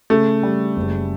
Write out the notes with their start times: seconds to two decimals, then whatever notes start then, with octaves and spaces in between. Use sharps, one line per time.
0.10 C#3 A3
0.43 G3
0.77 F#1